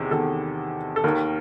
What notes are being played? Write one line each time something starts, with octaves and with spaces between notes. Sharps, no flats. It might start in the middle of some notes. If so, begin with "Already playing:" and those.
Already playing: E2 C3 D#3 G#4
E2 C3 D#3 A4
A4
D#2 D#3 A#4